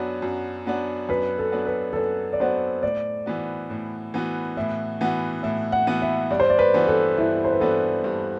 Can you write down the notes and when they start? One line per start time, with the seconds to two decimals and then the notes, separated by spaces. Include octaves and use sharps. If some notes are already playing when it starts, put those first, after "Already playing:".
Already playing: F#2 F#3 B3 D4 F#4
0.22 F#2
0.66 F#3 B3 D4 F#4
1.09 F#2 B4
1.39 A4
1.52 F#3 B3 D4 F#4
1.67 B4
1.93 A4
1.96 F#2 B4
2.33 D5
2.40 F#3 B3 D4 F#4 C5
2.83 A2 D5
3.26 E3 B3 F#4
3.70 A2
4.14 E3 B3 F#4
4.57 A2 E5
5.01 E3 B3 F#4
5.43 A2 E5
5.72 F#5
5.87 E3 B3 F#4
6.02 E5
6.31 G2 D5
6.40 C5
6.50 D5
6.59 B4
6.74 E3 B3 D4 F#4
6.88 A4
7.18 G2 E4
7.45 C5
7.52 B4
7.60 E3 B3 D4 F#4 A4
8.04 G2